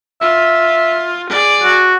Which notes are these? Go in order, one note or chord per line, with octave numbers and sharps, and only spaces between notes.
F4 E5
G#4 D5
F#4